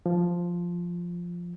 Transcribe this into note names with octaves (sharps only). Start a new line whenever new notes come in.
F3